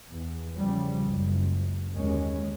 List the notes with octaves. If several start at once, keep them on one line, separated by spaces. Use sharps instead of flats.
E2
E2 C#3 F3 G3
F#1 C#2
D#2 D3 G#3 C#4